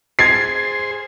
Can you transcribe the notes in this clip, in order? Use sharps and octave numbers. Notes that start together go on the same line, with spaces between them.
G#4 C5 G#6 A6 C7